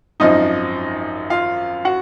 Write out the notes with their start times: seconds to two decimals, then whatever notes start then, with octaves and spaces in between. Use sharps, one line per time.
0.20 G#1 F#2 F3 D#4 D#5
1.30 F4 F5
1.85 F#4 F#5